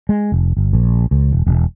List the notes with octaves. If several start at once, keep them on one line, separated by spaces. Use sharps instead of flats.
G#3
F1
G1
A#1
C#2
E1
E1